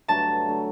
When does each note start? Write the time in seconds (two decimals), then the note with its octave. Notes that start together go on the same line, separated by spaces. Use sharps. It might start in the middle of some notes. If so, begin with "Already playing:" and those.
0.08 G2 D3 F#3 A3 A5
0.48 D3 F#3 A3